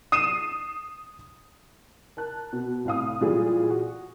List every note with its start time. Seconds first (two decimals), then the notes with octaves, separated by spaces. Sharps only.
0.12 D#6 C7 D#7 E7
2.17 A#4 A5 F#6
2.53 B2
2.85 C2 A2 F5 D#6
3.21 A#2 E3 F#3 G3 F4 G#4
3.70 F#4